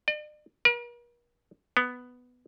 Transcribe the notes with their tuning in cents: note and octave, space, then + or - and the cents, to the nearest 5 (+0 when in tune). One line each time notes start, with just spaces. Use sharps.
D5 +45
A#4 +45
B3 +5